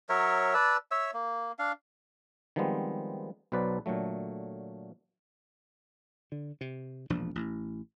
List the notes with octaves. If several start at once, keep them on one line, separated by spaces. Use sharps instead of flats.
F#3 A#4 C#5 E5
B4 D5 A5 E6
C#5 E5 E6
A#3
D4 F5
D#3 F3 G3 G#3 B3 C4
B1 B2 F#3 B4 C5 D5
A#2 D3 F#3 A3
D3
C3
E1 A#1 F3 D4
A1